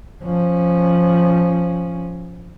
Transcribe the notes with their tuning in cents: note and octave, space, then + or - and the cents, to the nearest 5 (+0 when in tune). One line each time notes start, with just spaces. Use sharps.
F3 +0 C#4 +0